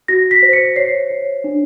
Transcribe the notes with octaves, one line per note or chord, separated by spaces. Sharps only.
F#4 A#6
B6
C5
C#7
C#5 C7
C#5
D4